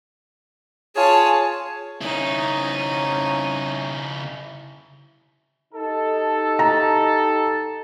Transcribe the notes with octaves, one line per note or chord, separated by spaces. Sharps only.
F4 G#4 C#5 G#5 A5
C#3 C#4 D#4 E4
D#4 G4 A4
A#5